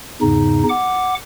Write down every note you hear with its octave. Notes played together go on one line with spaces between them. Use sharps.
E2 G#2 C#3 D#4
F#5 D6